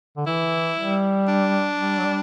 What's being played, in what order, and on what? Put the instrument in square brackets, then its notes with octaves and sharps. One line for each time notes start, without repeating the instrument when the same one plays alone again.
[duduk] D3
[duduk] E3 [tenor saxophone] E4
[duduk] G3
[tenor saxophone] D4
[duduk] G3
F#3
G3